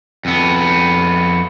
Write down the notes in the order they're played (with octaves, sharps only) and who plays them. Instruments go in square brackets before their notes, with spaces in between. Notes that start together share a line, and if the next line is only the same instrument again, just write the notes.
[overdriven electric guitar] F2 B3